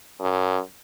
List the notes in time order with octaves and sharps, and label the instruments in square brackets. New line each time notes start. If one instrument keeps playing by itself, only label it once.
[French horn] F#2